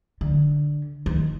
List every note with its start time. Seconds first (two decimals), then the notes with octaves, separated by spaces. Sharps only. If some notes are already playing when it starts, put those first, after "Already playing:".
0.21 D3
1.06 D#3